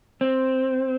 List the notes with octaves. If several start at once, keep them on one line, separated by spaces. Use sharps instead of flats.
C4